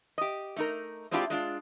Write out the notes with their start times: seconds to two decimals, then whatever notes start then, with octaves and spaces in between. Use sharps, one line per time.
0.18 G4 D#5
0.56 A3 D#4 A#4
1.11 G#3 C4 D4 E4 F4 G4
1.30 G#3 D4 F4